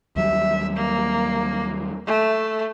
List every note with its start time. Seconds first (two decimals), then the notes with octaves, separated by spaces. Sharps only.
0.16 D#2 F#3 G3 E5
0.77 A#3
2.07 A3